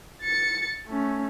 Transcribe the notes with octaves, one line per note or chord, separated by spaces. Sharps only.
A6 C#7
A3 C#4